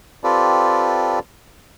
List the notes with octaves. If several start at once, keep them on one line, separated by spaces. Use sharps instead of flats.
C4 F4 G4 A4 B4 D5